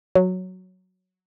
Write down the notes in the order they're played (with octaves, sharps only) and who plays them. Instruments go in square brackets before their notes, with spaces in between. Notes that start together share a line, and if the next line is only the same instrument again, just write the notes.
[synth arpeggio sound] F#3